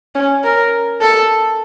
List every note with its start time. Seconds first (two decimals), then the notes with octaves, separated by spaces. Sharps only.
0.15 C#4
0.44 A#4
1.02 A4